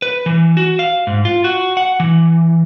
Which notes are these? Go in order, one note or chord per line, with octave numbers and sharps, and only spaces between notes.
B4
E3
F#4
F5
G#2
F4
F#4
F#5
E3